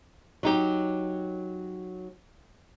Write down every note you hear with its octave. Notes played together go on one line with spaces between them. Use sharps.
F#3 D#4 G4